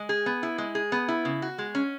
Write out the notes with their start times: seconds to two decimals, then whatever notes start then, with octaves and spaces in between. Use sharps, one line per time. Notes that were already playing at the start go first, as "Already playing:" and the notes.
Already playing: G#3
0.09 G#4
0.26 B3
0.43 E4
0.58 G#3
0.75 G#4
0.92 B3
1.08 E4
1.25 C#3
1.42 F#4
1.58 G#3
1.75 C#4